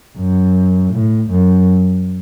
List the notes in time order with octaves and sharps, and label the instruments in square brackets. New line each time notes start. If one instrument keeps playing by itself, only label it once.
[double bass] F#2
A2
F#2